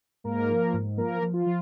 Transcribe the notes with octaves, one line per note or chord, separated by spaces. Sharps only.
G#2 A#3 A#4
F3
G#2
F3 A#3 A#4
F3
F4
F3